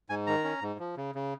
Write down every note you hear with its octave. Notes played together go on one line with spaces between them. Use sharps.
G#2 G#5
D#3 A#5
C#4
G#2
F3
C#3
C#3